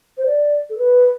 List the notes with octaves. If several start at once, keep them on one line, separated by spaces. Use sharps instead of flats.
C5
D5
A4
B4